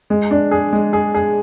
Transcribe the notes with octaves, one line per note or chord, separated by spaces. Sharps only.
G#3
D4
G#4
G#3
G#4
G#4